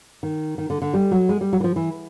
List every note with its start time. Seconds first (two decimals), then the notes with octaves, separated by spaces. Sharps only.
0.23 D#3
0.58 D#3
0.70 D3
0.82 D3
0.94 G3
1.11 F#3
1.29 G#3
1.41 G3
1.53 F#3
1.60 E3
1.64 F3
1.76 E3